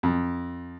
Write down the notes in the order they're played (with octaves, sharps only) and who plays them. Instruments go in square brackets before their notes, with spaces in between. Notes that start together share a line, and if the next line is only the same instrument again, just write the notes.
[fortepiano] F2